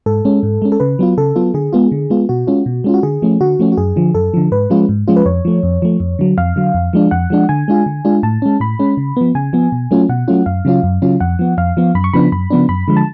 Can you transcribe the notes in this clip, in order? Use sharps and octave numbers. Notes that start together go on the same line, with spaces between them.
G#2 A4
G#3 C#4
G#2
G#3 C#4
A4
C#3 B4
F#3 B3 F4
C#3 A4
F#3 B3 F4
D3 G#4
G#3 B3 F4
D3
G#3 B3 F4
B2 F#4
G#3 C#4 F4
B2
G#3 C#4 F4
F#4
D3 G#4
F3 A3 C#4
D3 F#4
F3 A3 C#4
F#4
F#2 G#4
D3 F3
F#2 A4
D3 F3
G#2 B4
F3 G#3 C#4 F4
G#2
F3 G#3 C#4 F4
B4
F2 C#5
F3 A3
F2
F3 A3
F2
D3 F#3
F2 F5
D3 F#3
F2
F3 G#3 D4
F2 F#5
F3 G#3 D4
D3 G#5
G#3 D4 F4
D3
G#3 D4 F4
A2 A5
G#3 C#4
A2 B5
G#3 C#4
C#3
F3 B3
C#3 G#5
F3 B3
B2
F#3 A3 C#4 F4
B2 F#5
F#3 A3 C#4 F4
F#2 F5
C#3 F#3 C#4 F4
F#2
C#3 F#3 C#4 F4
F2 F#5
F3 B3
F2 F5
F3 B3
F#2 B5
C#6
C#3 F3 B3 D4 B5
F#2 B5
C#3 F3 B3 D4
F#2 B5
D3 F3 G#3
A5